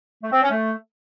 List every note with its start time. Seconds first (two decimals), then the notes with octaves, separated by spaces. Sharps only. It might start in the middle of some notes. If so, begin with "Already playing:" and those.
0.23 A3
0.32 C4
0.42 C#4
0.51 A3